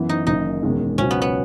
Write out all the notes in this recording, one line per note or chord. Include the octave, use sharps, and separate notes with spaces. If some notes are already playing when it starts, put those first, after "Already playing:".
Already playing: F#2 E3 B3
D#4
F#1 F#2 D#3 D#4
E1 E2 D#3 G#3 C#4
C#2 B2 F#3 C#4
B3
B3